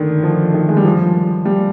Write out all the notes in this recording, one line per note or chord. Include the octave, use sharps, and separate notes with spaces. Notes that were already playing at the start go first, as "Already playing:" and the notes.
Already playing: D3 D#3
F3
D#3
G#3
G3
F3
G3